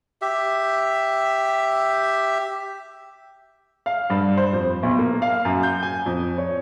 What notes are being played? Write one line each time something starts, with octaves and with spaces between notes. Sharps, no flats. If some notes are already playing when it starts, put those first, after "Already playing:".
G4 E5
F5
G2
C5
F2
B1
A#3
F5
F#2
G6
G#5
F2
C#5